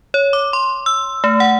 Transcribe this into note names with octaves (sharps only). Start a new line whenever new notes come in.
C#5
D6
C6
E6
A3
F#5